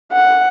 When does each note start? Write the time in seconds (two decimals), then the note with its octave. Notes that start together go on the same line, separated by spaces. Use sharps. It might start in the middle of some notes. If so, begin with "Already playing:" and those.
0.12 F#5